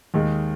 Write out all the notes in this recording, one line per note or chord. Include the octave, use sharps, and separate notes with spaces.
D#2 D#3 G#3